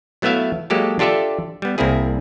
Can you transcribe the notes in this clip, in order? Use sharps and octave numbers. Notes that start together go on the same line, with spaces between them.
F#3 A3 B3 E4 E5 F5
F#3 G#3 A#3 G4 A4 A5
D4 F4 G4 A4 D5 E5
G3 B3
C2 A#3 C4 E4 G#4